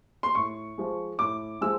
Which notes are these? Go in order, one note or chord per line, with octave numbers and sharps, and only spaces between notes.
C6
A2 C#6
F3 G#3
A2 D6
F3 G#3 E6